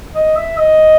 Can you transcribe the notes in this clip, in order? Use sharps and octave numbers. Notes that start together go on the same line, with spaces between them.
D#5
E5
D#5